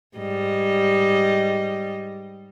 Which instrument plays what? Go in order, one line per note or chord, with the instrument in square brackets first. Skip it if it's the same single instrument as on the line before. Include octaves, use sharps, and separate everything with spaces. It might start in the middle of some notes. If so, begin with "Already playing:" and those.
[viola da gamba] G#2 G3 D#5